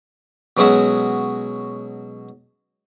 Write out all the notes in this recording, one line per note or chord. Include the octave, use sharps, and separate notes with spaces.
B2 F#3 G#3 C#4 F#4 E5